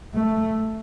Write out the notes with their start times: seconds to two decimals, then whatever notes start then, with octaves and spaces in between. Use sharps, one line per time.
0.15 A3